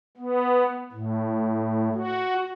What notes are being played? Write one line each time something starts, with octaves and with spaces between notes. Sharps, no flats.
B3
A2
F#4